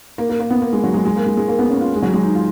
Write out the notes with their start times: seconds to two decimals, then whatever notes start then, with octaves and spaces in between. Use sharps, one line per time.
0.18 A#3
0.29 A#3
0.40 A#3
0.50 B3
0.62 A#3
0.73 G#3
0.84 F#3
0.94 G#3
1.05 G#3
1.16 A#3
1.26 G#3
1.37 G#3
1.48 A#3
1.59 B3
1.70 C#4
1.81 F4
1.96 G#3
2.02 F#3
2.14 G#3
2.23 D#4
2.35 F4